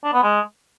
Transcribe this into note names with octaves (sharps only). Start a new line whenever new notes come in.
D4
B3
G#3